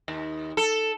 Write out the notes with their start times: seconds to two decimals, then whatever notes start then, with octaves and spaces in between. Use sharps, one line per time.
0.08 D#2
0.57 A4